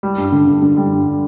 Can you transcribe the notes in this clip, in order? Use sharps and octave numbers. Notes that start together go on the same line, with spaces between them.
G3
G2
D3
D3
D3
G3
G2